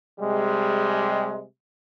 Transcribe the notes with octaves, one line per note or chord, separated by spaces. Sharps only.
C3 G3 G#3